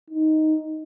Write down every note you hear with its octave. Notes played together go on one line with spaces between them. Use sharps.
D#4